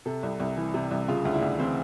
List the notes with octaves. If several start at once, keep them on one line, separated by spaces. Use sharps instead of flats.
C3 A4
C2
C2
E3
C3
C2
C#3 F4
D2
E4
D2
E3 C4